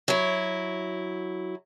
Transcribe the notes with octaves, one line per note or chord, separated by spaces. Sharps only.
F#3 E4